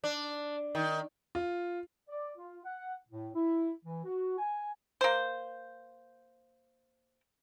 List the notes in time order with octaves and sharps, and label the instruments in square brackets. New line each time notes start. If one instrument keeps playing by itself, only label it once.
[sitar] D4
D#3
[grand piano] F4
[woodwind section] D5
F4
F#5
A2
E4
E3
F#4
G#5
[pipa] A#3 C5